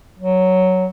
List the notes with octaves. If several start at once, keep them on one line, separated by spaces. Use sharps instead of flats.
F#3